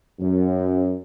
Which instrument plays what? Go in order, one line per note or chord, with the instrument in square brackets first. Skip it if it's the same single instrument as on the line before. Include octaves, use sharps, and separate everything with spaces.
[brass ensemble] F#2